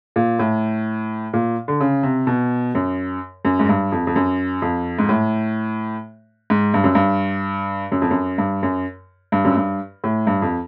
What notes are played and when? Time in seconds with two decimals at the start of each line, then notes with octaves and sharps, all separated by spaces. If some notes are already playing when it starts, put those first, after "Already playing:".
0.16 A#2
0.39 A2
1.33 A#2
1.68 D3
1.80 C#3
2.03 C3
2.27 B2
2.75 F#2
3.45 F#2
3.59 G#2
3.69 G2
3.92 F2
4.07 F2
4.16 F#2
4.62 F2
4.99 G#2
5.09 A2
6.50 G#2
6.74 G2
6.84 F#2
6.95 G2
7.92 F#2
8.02 F2
8.11 F#2
8.38 G2
8.63 F#2
9.32 G2
9.45 F#2
9.56 G2
10.04 A2
10.27 G2
10.42 F2